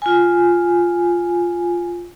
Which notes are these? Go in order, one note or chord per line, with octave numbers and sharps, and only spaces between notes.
F4 G#5